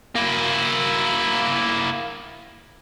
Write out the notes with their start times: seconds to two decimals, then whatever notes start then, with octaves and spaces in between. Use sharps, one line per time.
0.16 A#3 E4